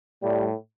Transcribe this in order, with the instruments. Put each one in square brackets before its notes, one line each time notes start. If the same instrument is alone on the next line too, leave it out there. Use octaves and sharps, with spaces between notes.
[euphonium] A2 [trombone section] G3